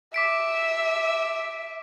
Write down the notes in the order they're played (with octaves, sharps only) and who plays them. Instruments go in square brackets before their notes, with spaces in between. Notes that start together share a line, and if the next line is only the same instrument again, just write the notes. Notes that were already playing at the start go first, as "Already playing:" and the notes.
[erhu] E5 [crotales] D6 B6 D7